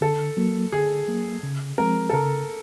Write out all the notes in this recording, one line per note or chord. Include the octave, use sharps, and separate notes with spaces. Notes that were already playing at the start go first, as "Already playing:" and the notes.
D3 A4
F#3 A#3
D3 G#4
F#3 A#3
C#3
F3 G#3 C4 A#4
A4
C#3 A#4